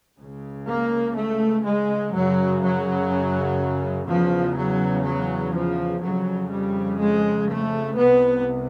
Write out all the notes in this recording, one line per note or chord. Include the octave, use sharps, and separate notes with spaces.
C#2 C#3
A#3
A3
G#3
F#2 C#3 F#3
F#3
E2 C#3 F3
F#3
F#3
F3
F2 C#3 F#3
G3
G#3
A3
C2 C3 B3